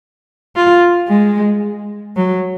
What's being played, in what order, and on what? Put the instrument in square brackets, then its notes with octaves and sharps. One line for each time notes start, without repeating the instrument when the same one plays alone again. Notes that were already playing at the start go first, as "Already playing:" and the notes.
[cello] F4
G#3
F#3